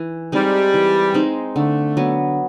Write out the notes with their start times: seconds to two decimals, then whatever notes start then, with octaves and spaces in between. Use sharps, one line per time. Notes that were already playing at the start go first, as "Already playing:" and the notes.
Already playing: E3
0.32 G3 G#3 C4 D#4
0.74 E3
1.14 G#3 C4 D#4
1.56 D3 A3
1.97 F#3 B3